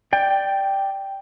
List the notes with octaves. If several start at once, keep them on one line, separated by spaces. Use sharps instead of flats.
D5 G5